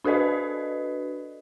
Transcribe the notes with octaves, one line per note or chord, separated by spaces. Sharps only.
D4 F#4 A4 B4 D5 D#5